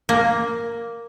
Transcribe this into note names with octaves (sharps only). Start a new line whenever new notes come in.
A#3